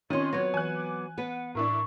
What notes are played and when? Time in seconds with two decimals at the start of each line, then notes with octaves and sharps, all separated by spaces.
0.10 D#3 C4 C#4 F4 C#5 D#5 C6
0.33 F#3 B3 G#6 A#6
0.54 E3 G#5 F#6
0.75 D6
1.18 B3 B4 F#5
1.55 A2 D4 E4 A#4 C#6